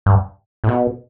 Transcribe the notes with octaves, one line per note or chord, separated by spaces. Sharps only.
G2
A2
B2